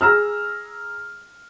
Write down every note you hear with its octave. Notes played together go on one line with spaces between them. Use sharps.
G#4 A#5 E6 F6